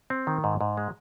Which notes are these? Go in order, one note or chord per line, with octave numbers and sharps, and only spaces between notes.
C4
D#3
G#2
G#2
G#3